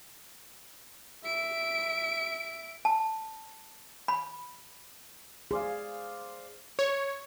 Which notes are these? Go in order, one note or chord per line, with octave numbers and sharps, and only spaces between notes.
E5 D7
A5
B5
G#4 C5 D5 F5
C#5